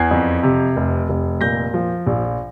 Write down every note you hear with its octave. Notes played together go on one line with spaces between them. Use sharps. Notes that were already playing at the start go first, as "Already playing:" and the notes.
Already playing: E2 G#6 C7
F2
C3
F1
F1
A#2 G6 A#6
F3
A#1